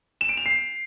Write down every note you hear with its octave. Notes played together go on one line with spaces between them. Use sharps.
E7
D7
F7
C7